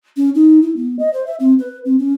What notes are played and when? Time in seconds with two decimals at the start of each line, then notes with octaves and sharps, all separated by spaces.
0.17 C#4
0.35 D#4
0.62 E4
0.76 B3
0.99 D#5
1.13 C5
1.26 E5
1.40 C4
1.59 B4
1.85 C4
1.99 C#4